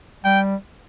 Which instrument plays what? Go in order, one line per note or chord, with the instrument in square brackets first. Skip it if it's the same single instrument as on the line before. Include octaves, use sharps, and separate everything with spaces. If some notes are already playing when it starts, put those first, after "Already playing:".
[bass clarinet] G3 [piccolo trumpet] G5